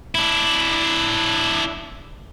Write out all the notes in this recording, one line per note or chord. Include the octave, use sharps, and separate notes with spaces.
D4 E4